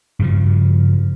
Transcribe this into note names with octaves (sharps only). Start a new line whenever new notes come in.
G2 C#3 F3